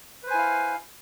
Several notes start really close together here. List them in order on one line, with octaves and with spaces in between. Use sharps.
B4 C5 G#5 E4 F5